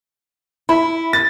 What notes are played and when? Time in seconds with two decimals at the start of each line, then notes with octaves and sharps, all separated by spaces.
0.69 E4 B5
1.13 A6